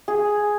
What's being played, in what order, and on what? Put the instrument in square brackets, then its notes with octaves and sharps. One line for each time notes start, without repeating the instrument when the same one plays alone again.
[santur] G#4